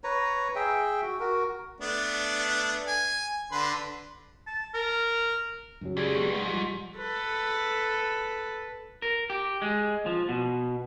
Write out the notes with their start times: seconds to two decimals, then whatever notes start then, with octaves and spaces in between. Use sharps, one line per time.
0.04 B4 C#5 A#5
0.55 G#4 E5 G5
1.02 F#4
1.20 F#4 A#4
1.81 A3 B3 D4
2.87 G#5
3.52 D3 B4 C6
4.47 A5
4.74 A#4
5.81 F#2 C#3 F#3
5.97 C#2 G4 G#4 D5
6.14 F#3 B3 C#6
6.34 G#2 G#3
6.46 F3 G3 G#3
6.97 A4 B4
9.02 A#4
9.30 G4
9.62 G#3
10.06 F3
10.29 B2